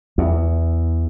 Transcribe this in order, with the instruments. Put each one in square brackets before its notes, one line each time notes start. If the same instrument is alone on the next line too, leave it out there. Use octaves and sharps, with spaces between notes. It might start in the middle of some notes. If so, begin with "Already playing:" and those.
[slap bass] E2